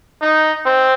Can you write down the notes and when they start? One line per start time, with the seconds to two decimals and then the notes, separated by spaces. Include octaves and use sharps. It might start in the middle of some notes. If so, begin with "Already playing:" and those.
0.21 D#4
0.66 C4